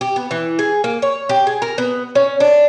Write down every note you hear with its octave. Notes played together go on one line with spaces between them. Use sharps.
G4
B3
E3
G#4
A#3
C#5
G4
G#4
A#4
B3
C#4
D4